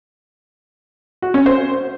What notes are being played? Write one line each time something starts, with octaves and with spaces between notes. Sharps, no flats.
F#4
C#4
C5